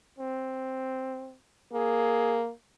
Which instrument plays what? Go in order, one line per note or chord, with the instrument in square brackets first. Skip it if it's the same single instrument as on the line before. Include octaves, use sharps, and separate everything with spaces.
[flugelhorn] C4
[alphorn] A#3 [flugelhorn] G#4